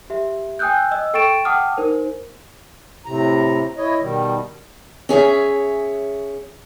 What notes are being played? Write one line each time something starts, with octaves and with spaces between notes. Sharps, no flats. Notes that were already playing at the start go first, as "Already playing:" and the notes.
G4 E5
G5 G#5 D#6 E6 F#6 G6
D#5 E6
A4 G5 C#6 A6 D7 E7
F#5 G5 A5 D6 D#6 F6
D#4 A#4 C5
A2 C3 A#5
E4 C#5 D#5
B2 D#3 G3
C#4 G#4 C#5 E5